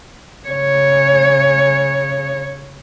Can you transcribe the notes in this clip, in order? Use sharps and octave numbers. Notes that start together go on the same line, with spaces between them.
C#3 C#5